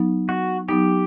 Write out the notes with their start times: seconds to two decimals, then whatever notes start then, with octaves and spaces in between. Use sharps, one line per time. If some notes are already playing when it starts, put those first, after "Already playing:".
Already playing: F#3 B3 D#4
0.29 F#4
0.69 F#3 B3 D#4 G4